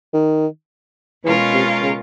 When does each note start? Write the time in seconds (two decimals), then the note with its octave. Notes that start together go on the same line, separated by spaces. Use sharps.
0.13 D#3
1.24 B2 E3 G#3 C#4 F4 A#4
1.53 C3
1.82 C#3